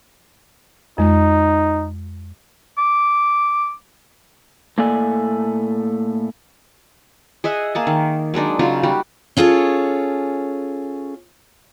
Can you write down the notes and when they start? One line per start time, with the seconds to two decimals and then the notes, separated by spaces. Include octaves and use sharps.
0.98 F2 G#3 D#4
2.78 D6
4.78 A2 A3 A#3 A4 D5 G#5
7.44 G#4 D#5 E5 F#5
7.75 A#3 G#4 A5
7.87 D#3
8.34 F#3 G#3 D4 D#4
8.59 C#3 F#3 D#4 F4
8.83 G3 F#4 G4
9.37 C#4 F4 G#4 A4 C#5